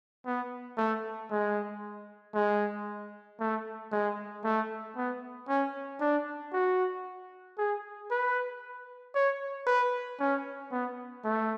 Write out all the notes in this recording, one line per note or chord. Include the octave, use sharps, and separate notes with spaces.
B3
A3
G#3
G#3
A3
G#3
A3
B3
C#4
D4
F#4
G#4
B4
C#5
B4
C#4
B3
A3